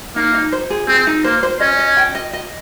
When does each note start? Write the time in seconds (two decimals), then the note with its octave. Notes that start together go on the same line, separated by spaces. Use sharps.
0.16 A#3 D#4
0.34 D#4
0.52 C5
0.70 G#4
0.88 C4 G#4
1.07 D#4
1.24 A#3 C5
1.43 C5
1.61 C#4 D#5
1.79 D#5
1.97 G5
2.15 D#5
2.33 D#5